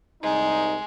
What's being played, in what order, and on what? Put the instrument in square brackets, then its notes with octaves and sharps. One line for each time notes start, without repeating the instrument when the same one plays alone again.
[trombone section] C2 D#4 [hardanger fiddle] G#3